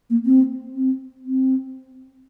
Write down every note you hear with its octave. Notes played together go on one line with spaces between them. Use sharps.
A#3
C4
C4
C4